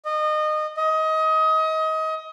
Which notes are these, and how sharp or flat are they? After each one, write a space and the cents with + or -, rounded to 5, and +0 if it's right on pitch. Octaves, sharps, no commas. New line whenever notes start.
D#5 -25
D#5 +25